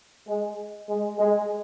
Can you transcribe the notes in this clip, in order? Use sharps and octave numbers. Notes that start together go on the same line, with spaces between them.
G#3
G#3
G#3